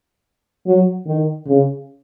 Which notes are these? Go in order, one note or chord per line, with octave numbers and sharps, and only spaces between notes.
F#3
D#3
C#3